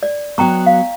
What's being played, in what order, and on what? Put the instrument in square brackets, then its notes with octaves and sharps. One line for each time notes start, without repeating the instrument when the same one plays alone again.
[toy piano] D5
[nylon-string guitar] F#3 B3 [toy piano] G5 A#5 C#6
[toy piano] F5